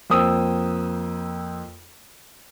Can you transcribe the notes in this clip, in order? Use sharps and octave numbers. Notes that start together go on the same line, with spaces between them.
F2 A#3 C5 G5 D#6 E6